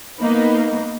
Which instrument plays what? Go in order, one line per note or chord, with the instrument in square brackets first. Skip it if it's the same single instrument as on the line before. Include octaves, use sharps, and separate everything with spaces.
[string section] A#3 B3 D#4 B4